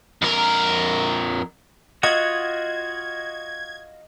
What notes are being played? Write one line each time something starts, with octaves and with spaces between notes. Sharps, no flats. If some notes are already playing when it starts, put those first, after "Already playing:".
F2 A#4
F4 F#4 D#5 F#5 G#6